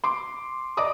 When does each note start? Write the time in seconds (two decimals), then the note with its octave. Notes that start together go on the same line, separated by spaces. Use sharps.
0.04 C6 D6
0.77 D5 D#5 A#5 D6 D#6